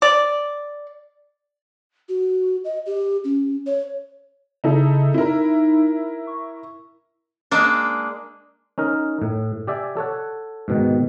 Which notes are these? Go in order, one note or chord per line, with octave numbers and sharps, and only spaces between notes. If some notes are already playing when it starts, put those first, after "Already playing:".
D5
F#4
D#5
G4
C#4
C#5
C#3 D#4 E4 A4
D#4 E4 A#4
C#6
G#3 A#3 D4
C#4 D#4 A#4
A2
G4 D5 E5 G#5
A4 C#5 F#5
G#2 B2 D#3